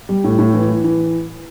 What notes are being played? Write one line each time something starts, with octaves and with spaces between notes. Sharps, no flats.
G3
A2
A2
E3
E3
E3